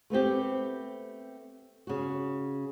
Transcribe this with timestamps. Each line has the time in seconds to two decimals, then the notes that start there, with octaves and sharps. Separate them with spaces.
0.10 A3 B3 C4 G4
1.87 C#3 F#4